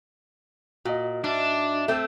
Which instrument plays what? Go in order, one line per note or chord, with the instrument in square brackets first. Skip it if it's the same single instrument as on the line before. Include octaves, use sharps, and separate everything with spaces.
[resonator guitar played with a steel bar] A#2 [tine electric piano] F#4 D#5
[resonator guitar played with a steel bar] G#2 [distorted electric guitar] D4 [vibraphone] E5 D6
[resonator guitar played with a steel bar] A3 C4